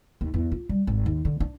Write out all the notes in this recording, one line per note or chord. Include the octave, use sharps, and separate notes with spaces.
D#2
E2
F4
G3
G#1
D#2
D3
D4